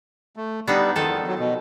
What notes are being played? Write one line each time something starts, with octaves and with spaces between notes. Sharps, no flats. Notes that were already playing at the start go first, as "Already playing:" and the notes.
A3
G3 B3 D4 D#4
E2 D#3 F3 A4
F#3
B2